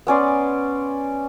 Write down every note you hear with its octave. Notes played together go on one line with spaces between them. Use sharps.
B3 C#4 D5 C6